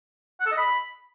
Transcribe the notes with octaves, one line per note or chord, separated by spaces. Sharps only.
F#5
A4
D#5
B5